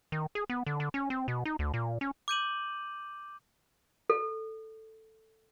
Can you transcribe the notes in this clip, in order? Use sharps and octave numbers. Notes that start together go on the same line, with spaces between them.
D#3
G#4
B3
D3
D3
C#4
C4
B2
D#4
D2
A#2
C#4
D6 G6 D#7 F#7
A4